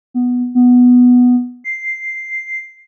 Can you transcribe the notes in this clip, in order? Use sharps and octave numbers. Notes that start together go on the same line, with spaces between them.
B3
B3
C7